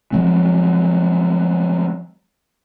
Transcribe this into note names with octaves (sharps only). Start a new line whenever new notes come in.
F3 F#3 G#3 C4